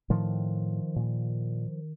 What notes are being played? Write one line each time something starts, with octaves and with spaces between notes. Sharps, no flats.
A2 D#3 F3
A#2